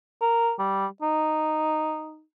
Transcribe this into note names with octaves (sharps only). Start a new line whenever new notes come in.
A#4
G3
D#4